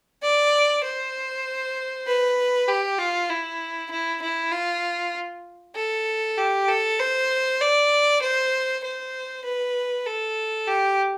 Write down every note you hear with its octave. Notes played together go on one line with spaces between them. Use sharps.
D5
C5
B4
G4
F4
E4
E4
E4
F4
A4
G4
A4
C5
D5
C5
C5
B4
A4
G4